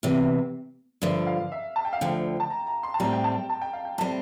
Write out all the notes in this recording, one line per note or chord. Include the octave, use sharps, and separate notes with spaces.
E2 C3 E3
G2 D3 F3 E5
F5
E5
A5
G5
F5
D2 D3 F3 G5
A5
A#5
A#5
C6
A5
A2 G3 C4 A#5
G5
A5
A5
G5
F5
G5
A2 G3 C4 A5